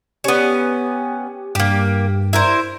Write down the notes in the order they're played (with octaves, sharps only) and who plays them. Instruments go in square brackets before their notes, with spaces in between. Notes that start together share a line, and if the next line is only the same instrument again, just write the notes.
[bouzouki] B3 C#4 [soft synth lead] G4
[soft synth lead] G2 [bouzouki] A#3 G4
[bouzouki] E4 A#4 C5